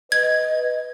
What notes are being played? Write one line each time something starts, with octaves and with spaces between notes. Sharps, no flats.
B4 D#5 G#6